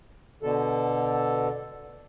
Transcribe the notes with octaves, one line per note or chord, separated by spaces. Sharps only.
B2 D3 A4